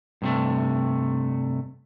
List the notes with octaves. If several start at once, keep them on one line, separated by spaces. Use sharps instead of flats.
G2 C3 A3